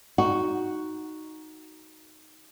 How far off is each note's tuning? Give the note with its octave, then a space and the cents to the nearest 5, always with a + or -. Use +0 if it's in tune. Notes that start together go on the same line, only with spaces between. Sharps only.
D#4 +0 F#4 +0